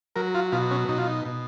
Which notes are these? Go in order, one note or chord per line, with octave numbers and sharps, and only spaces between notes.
F#3 A#4
F4
B2 F4
C#4
B2 D#4
F4
D#4
B2